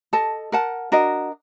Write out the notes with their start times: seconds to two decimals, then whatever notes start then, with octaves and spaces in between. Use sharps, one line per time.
0.13 A4 D#5 A5
0.52 A#4 F#5 A5
0.92 D4 F#4 A#4 D#5